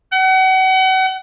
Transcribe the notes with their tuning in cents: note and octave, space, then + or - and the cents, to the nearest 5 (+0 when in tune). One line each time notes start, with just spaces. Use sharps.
F#5 +35